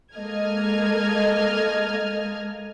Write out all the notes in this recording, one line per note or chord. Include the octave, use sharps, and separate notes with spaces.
G#3 A#3 A4 D#5 F6 G#6